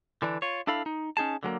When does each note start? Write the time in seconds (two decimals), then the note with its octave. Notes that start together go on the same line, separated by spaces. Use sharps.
0.22 D3 E3 D4
0.42 F4 C#5
0.67 D4 E4 A4 F5 B5
0.86 D#4
1.17 C#4 D#4 G#4 A5
1.43 D3 F#3 G#3 A#3